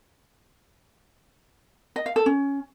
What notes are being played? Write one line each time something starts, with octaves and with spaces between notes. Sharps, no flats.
D#5
F5
A4
C#4